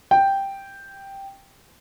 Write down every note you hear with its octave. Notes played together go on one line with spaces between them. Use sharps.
G5